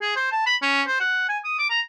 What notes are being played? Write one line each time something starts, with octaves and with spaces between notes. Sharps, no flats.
G#4
C5
A5
B5
C#4
C5
F#5
G#5
D#6
D6
A#5